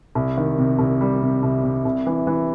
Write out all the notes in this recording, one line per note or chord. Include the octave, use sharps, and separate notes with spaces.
C2
D#3
C3
C2
G3
C3
C2
C3
C2
E3
E3